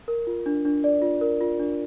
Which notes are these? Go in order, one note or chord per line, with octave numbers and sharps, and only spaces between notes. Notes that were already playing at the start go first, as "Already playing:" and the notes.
A#4
F4
D4
D4
D5
F4
A#4
F4
D4